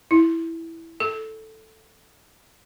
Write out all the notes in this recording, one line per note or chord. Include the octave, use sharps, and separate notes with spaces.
E4
A4